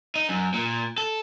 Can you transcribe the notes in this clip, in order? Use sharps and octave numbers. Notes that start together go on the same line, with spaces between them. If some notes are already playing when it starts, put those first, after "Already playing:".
D#4
F#2
A#2
A4